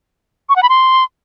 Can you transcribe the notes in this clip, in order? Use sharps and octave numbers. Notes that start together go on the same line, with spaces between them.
C#6
F#5
B5
C6